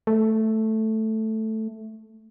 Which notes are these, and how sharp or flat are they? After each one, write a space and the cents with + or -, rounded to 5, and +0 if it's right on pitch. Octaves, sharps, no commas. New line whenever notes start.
A3 +0